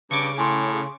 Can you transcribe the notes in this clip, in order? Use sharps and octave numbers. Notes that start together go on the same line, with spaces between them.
G2 C#3 C#6 D6
A2 G#5 C6